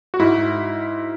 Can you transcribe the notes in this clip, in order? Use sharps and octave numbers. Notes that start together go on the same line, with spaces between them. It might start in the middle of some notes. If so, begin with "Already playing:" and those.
F#4
G#2 E4